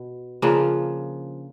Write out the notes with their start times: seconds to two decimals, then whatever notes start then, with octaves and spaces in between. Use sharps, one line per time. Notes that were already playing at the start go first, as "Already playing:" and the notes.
Already playing: B2
0.42 C#3 F3 A#3 D4